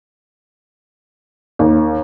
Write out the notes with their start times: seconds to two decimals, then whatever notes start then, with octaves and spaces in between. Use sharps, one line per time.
1.59 D#2